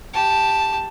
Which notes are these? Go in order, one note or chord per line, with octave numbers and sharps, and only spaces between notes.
G4 A5